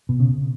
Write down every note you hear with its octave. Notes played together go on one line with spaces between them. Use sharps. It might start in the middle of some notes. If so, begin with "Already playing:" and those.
B2
C#3